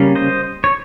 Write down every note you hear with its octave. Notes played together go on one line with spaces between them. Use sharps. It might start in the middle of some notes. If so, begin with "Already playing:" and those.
Already playing: C#3 G3 A#3 C#4
C5 D#5
C#5